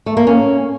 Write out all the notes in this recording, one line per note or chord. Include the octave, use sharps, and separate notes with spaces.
A3
A#3
C#4